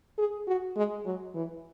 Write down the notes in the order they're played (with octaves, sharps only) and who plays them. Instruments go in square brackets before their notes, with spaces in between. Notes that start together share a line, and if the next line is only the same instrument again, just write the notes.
[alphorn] G#4
F#4
G#3
F#3
E3